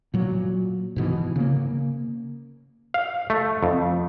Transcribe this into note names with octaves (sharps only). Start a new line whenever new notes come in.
A#2 F#3
G#2 B2 E3
C#3 A#3
F5
A3
F2